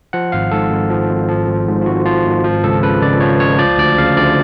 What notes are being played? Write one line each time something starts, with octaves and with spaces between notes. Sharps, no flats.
F3 F#5
G#1 F5
G#2 A4
G#1
F3
G#1
F3
G#1
G#2
F4
G#1 F#4
F3 F4
G#1
F3
C#2 A4
C#3 B4
C#2 D5
F3 C#5
C#2 C#5
F3 D5
D2 D5
C#3 F5
D2 D5